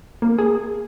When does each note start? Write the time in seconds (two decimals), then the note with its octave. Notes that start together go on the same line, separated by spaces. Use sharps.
0.22 A#3
0.38 G#4